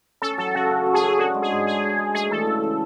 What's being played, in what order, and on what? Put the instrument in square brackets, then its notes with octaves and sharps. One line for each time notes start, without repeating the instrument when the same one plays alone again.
[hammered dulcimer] C#4 [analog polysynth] A4
[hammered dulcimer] F#3 [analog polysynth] A4
[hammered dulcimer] C#3 [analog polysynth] F#4
[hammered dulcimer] C#3
C#4
[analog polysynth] G#4
[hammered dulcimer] F#3
[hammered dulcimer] D4 [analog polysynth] F#4
[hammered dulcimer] G#3
[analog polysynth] G#4
[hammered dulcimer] G#2
[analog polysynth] G#4 [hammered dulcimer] A4
[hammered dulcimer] D4
G#3
[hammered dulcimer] A3 [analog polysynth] G#4
[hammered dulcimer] E3 [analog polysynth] A4
[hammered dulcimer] C#3
C#3